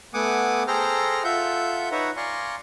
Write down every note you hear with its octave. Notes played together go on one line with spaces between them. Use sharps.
A3 B3 F#5 G#5 D6 D#6
G#4 A4 C5 G5 A#5 F6
F4 A4 E5 F#5 G6
D#4 B4 C#5 E5 F#5 A#5
D5 F5 G#5 A#5 C6 C#6